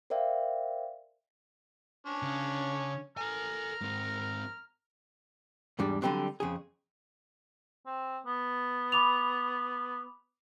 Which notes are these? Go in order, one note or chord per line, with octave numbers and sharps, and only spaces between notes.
A#4 C5 D5 E5 F5 G5
C#4 D4 C#5
C#3
A4 G#5 A#5 F6
G#2 C4
E2 G#2 G3 D4
D3 F#3 G3 C4 D4
F2 C#3 G#4
C4
B3
B5 D6 F7